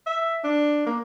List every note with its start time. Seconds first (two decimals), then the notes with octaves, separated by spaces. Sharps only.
0.06 E5
0.44 D4
0.86 A#3